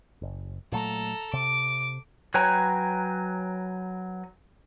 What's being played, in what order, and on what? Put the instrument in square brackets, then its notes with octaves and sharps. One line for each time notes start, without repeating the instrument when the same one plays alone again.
[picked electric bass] F#1
[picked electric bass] A#2 F#3 A3 [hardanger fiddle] A4 A#5
[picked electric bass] C3 [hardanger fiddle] D6
[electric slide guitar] F#3 B4 C#5 G5 G#5 A#5